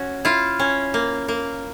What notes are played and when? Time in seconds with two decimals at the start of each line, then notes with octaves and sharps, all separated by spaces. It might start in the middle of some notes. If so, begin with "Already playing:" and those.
Already playing: C#4 F#4
0.25 E4 F4
0.59 C#4
0.94 A#3
1.28 A#3